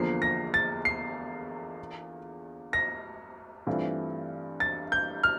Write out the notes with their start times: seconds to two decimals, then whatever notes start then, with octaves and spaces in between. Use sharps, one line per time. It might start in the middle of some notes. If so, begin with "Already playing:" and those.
Already playing: E2 D3 F3 A#3 F4 C7
0.22 A#6
0.54 A6
0.85 C7
2.73 A#6
3.67 G2 E3 A3 C4 F4
4.60 A6
4.92 G6
5.23 F6